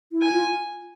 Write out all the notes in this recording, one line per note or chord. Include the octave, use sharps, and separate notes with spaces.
E4
G#5
F4